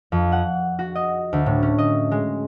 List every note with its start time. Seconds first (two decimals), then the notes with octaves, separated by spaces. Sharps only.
0.12 F2
0.32 F#5
0.79 F#4
0.95 D#5
1.33 D2
1.46 A2
1.63 C#4
1.78 D#5
2.11 G#3